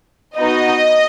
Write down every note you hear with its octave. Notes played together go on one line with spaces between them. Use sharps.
B3 D#4 F#4 D#5